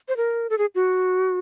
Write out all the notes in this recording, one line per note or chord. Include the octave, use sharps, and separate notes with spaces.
C5
A#4
A4
G#4
F#4